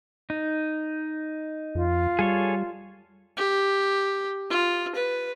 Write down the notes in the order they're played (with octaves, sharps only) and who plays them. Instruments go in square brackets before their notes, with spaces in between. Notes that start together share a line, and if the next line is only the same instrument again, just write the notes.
[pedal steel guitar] D#4
[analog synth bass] F2 [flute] F4
[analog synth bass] G3 [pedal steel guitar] G#4 A4 C#5
[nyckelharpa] G4
F4
B4